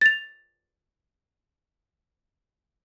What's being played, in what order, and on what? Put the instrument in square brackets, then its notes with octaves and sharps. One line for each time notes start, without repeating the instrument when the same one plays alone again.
[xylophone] A6 F7